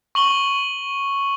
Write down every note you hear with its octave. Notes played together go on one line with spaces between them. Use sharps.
C#6 F#7 G7